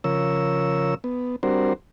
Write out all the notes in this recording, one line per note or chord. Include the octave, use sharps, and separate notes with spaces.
C#3 F3 A#4 C#5 E6
B3
G3 C4 D4 F#4 A#4 C5